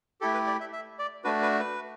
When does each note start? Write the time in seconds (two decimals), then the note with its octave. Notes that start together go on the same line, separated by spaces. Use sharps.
0.21 A3 E4 G4 A4
0.34 B4
0.47 D5
0.60 E5
0.73 E5
0.99 D5
1.24 A3 D4 F#4 B4
1.42 B4
1.59 B4